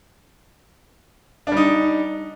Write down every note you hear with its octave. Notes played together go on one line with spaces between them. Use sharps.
G3 D4 D#4